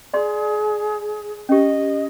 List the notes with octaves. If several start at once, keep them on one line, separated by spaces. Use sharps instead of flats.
G#4 D5 C6
C#4 G4 D#5